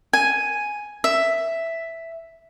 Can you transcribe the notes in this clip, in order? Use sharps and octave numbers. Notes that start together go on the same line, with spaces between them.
G#5
E5